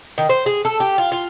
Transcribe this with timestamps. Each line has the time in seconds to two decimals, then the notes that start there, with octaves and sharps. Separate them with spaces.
0.18 D#3
0.29 C5
0.46 G#4
0.65 A4
0.80 G4
0.98 F4
1.12 F4